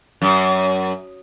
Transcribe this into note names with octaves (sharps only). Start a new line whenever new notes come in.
F#2